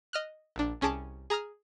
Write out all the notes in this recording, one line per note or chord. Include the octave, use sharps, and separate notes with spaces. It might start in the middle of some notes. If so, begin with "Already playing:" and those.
D#5 F6 F#6
A#1 D4
C2 C#4 G#4 A5 D6
G#4 A#5 D#6 F6